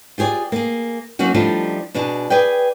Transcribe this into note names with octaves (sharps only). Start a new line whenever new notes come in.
F4 G4 G#4 C5 D5
A#3 G#4
F#3 A#3 C#4 D#4 F#4
F3 G3 A3 D4 D#4 F4
B2 D4 D#4 G#4
G#4 B4 D5 G5